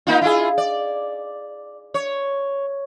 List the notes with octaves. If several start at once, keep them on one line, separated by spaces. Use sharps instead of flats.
A#3 D#4 F4
E4 F4 G#4
D5
C#5